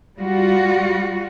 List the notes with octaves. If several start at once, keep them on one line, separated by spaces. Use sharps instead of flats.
G3 F4 F#4